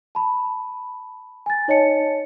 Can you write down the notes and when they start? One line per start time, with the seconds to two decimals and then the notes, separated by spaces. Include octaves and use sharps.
0.15 A5 B5
1.46 G#5 A6
1.68 D#4 C#5 D#5 A5 C#7